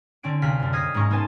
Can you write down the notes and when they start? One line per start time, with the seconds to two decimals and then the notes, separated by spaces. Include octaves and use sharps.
0.23 D3 C4 C#4 D7
0.42 D2 C3 G#4 F5 F6 B6
0.60 F#2 D3
0.73 D#5 D#6 F6 G#6 B6 C7
0.94 G#2 G#3 A#3 C#4 A#5 C#6
1.10 A#3 B3 C#4 C5 G#5 A5